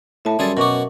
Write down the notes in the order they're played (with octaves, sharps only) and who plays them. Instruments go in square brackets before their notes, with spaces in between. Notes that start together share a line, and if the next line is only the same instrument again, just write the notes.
[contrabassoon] A2 [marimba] E5 A5
[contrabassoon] F#2 [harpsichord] G3 G#4 A4 [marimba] C6 A6
[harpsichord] B2 F#4 [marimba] A#4 C#6 D6